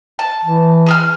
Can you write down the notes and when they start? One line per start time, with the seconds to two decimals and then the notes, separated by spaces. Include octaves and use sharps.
0.19 A5
0.45 E3
0.86 G#4 E6 F6